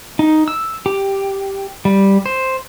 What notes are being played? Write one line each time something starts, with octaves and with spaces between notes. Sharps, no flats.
D#4
E6
G4
G3
C5